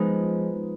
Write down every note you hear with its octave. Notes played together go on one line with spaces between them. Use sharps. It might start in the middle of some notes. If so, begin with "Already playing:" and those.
Already playing: F3 G#3 B3 D#4 F4